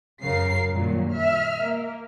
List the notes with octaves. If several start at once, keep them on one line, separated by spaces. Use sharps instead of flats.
F#2 C#3 A#4 F5 C7
G2 A#2 D#3 F#3
E5 F6
A#3